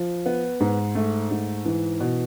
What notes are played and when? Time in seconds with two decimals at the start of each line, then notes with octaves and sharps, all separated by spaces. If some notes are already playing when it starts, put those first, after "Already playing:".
Already playing: F3
0.26 B3
0.60 G#2
0.95 A3
1.31 G#2
1.65 E3
2.00 B2